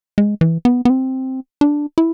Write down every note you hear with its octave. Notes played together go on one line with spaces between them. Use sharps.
G#3
E3
B3
B3
C4
D4
E4